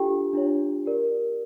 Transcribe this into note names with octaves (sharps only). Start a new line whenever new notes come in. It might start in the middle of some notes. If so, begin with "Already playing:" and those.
Already playing: D4 F4 G4 A4 G5
D4 F4 C#5
G4 A#4 D5